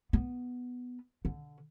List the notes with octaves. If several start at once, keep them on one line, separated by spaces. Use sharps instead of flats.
B3
D3